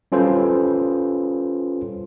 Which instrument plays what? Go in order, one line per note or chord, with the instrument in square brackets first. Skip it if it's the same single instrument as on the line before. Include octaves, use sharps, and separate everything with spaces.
[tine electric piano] G3 C#4 F4 A4 B4 C5